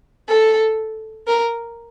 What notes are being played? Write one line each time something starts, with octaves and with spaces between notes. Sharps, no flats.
A4
A#4